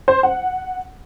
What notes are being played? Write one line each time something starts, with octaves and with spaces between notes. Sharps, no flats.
C5
F#5